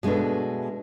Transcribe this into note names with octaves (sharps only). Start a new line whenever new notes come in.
B2 G#3 A3 D4 B4